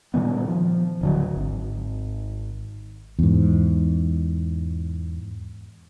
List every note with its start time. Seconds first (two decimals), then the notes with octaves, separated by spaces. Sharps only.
0.14 A#2 D#3 G3 B3
0.48 F3
1.01 D1 D3 F#3
1.36 G#1
3.19 E2 G#2